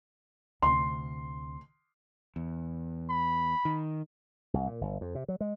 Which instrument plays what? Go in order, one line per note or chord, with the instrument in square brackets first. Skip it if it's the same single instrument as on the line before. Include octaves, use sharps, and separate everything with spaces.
[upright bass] D2 C3 [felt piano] C6
[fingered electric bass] E2
[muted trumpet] B5
[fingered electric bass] D#3
[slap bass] C2
A#2
G1
F2
C3
F#3
G#3